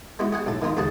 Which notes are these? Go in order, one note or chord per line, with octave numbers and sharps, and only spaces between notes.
G#3 B3 E4 F#4
G#4 F#5 G#5
B1 A2 A4
D#3 B3 D#4 F4 A#4
D#2 C#3 F#4 G#4 A5